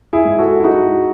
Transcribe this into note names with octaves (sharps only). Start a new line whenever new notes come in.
E4 G#4
G#2
F#4 A4
E4
G#3 D#4 F#4